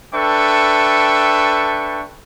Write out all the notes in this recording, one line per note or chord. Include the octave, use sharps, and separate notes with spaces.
D4 A4 B4 E5 G5 C#6